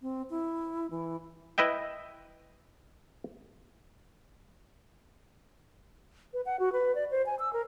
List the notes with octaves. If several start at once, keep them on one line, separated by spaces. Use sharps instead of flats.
C4
E4
E3
E4 B4 D#5 E5 G5
B4
F#5
F#4
B4
D5
C5
G#5
E6
A#4